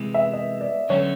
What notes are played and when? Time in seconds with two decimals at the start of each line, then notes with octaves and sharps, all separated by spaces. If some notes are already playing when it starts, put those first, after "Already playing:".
Already playing: C3 E3 G#3
0.14 E5
0.33 D#5
0.61 D5
0.89 D3 F#3 A3 C#4 C#5